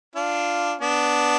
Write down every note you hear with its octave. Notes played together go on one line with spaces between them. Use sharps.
D4 F4
B3 D4